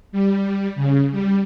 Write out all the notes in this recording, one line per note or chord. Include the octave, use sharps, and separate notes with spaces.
G3
C#3
G3